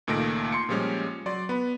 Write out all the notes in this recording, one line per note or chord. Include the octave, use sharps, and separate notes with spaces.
C#2 A#2 D#3 A3 A#6 D7
C6 C#7
A#2 F3 G3 G#3 C#4
F#3 D5 C6
B3 B5